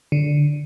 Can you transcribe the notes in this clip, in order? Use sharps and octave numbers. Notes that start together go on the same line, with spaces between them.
D3